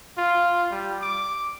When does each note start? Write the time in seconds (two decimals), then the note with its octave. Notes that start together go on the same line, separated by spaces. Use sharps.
0.18 F4
0.71 G3
1.01 D6